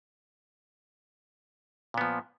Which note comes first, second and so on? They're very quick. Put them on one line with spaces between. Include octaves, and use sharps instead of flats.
A#2 B3 F3